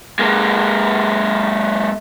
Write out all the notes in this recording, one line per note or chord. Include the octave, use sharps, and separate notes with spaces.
G#3 A#3